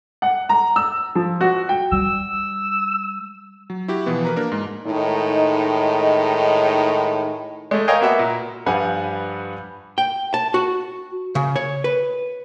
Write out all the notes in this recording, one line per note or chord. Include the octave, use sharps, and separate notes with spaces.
F#5
A#5
E6
F3
F#4
G5
G3 E6
F#3
E4 F#4 G4
B2 E3 F3 B3
A#4 B4 A#5
A#3 D4 A#4
G#2
A2 D#3 G#3 D#4
G#3 A3
A#4 C#5 D#5 F5 G5 G#5
A#3 B3 F#4 E5
A#2
G2 F3 G3 B4 F#5 G#5
G5
A5
F#4
C#3
C#5
B4